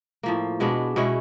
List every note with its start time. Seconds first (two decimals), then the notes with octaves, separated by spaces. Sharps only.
0.23 A2 F3 A#3
0.60 B2 G#3 B3 D4
0.96 B2 G#3 C#4 E4